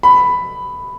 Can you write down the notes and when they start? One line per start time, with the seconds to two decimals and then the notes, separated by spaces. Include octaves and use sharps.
0.03 B5